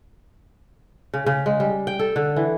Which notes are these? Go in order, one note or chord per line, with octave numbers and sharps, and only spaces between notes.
C#3
C#3
G#3
G3
G5
A4
D3
E3